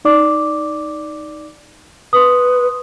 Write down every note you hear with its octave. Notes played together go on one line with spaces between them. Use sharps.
D#4 D5 D6
B4 C6 D#6